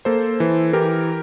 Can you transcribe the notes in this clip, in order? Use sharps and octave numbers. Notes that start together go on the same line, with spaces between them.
A#3 A4 C5
E3
E3 G4 A#4